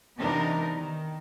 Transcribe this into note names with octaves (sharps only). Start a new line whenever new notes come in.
C3 E3 B3 D4 D#4 A#4
D#3